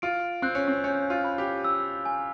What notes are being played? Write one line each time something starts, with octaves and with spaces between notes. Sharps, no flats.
F4 D7
C4 F#6
C#4
C4
C#4 G6
F4
B5
G4
E6
G#5